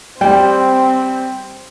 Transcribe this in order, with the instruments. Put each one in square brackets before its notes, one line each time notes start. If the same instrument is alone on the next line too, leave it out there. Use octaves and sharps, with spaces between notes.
[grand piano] G3 [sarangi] C4 [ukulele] G5